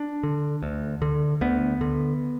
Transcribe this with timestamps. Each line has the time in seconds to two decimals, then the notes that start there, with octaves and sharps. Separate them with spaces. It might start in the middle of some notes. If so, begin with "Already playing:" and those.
Already playing: D4
0.23 D3
0.63 D2
1.02 D3
1.41 D2 B3
1.81 D3